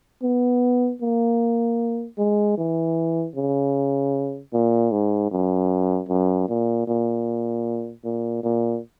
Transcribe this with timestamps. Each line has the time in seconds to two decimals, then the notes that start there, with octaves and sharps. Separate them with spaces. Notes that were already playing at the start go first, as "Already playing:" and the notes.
0.23 B3
1.02 A#3
2.18 G#3
2.58 E3
3.36 C#3
4.53 A#2
4.92 G#2
5.31 F#2
6.09 F#2
6.49 A#2
6.87 A#2
8.05 A#2
8.43 A#2